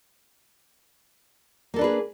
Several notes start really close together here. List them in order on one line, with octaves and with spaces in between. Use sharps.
A#3 A4 D4 B4 G#4